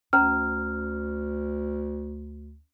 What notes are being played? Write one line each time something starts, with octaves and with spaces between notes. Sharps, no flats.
D2 C#4 C5 A#5 F6